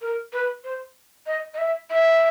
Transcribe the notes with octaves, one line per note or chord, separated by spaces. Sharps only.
A#4
B4
C5
D#5
D#5
E5
E5